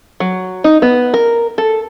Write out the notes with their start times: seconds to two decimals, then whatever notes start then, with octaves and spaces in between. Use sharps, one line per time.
0.20 F#3
0.64 D#4
0.82 B3
1.14 A#4
1.58 A4